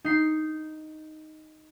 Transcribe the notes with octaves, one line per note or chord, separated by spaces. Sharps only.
D#4 C7